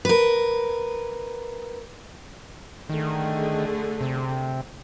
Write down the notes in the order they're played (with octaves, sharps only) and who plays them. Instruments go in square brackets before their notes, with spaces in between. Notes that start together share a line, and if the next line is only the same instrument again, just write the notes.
[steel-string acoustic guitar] A#4 B4
[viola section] D3 A3 G#4 [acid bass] D#3
[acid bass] C3